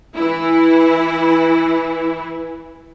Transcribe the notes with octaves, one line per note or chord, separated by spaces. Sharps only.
E3 E4